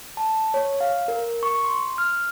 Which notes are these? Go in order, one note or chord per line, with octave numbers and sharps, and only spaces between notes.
A5
C#5
F5
A#4
C#6
C6
F6